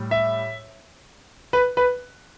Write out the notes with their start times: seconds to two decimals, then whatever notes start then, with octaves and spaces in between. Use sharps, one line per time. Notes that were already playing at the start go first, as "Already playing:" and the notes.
Already playing: A2 G3
0.11 E5
1.53 B4
1.77 B4